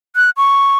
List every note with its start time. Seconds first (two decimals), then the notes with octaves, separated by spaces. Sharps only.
0.16 F#6
0.37 C#6